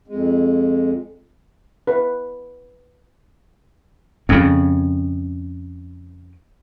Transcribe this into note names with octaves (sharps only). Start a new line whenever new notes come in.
F2 G#3
B4
F2 C#3